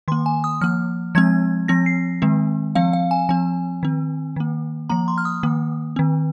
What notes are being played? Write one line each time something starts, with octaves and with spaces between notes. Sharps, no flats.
D#3 A#3 C6
G#5
D#6
F3 A#3 F6
F3 G#3 C4 G#6
F3 C4 A#6
C7
D#3 G#3 C4
F3 C4 F5
F5
G#5
F3 C4 G#5
D#3 C4
D#3 A#3
F3 A#3 A#5
C6
F6
D#6
D#3 A#3
D#3 C4